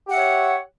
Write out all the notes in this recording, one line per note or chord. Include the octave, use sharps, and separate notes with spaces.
G4 C#5 E5 F#5